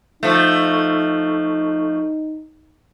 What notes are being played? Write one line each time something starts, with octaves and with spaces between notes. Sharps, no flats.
F3 A3 D#4